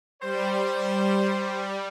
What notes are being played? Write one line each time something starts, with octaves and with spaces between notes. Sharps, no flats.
G3 C5